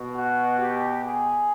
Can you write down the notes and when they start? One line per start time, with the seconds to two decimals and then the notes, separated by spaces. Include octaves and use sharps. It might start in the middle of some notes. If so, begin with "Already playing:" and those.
Already playing: B2
0.15 F#4
0.59 G4
1.03 G#4